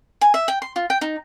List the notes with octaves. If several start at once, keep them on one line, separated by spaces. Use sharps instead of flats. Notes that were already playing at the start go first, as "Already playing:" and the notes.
G#5
E5
G5
C6
F4
G5
D#4